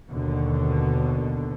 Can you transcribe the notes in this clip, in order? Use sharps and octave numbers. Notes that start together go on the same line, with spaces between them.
D#2 B2 D3